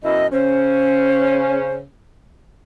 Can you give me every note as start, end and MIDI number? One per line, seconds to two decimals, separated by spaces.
0.04 0.24 42
0.04 0.24 47
0.04 0.24 64
0.04 0.27 75
0.32 1.84 49
0.32 1.84 61
0.32 1.73 72